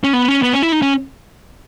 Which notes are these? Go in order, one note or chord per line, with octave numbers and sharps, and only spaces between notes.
C#4
B3
C#4
B3
C#4
E4
D#4
C#4